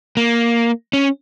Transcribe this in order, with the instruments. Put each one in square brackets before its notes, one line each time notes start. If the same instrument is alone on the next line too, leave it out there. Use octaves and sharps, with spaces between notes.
[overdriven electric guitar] A#3
C#4